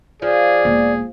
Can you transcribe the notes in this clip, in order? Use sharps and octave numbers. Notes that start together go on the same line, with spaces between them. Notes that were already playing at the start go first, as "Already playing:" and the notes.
F3 G#4 D5
E1 A#3